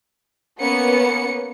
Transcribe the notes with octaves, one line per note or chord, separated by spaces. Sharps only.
A#3 B3 C#4 C#7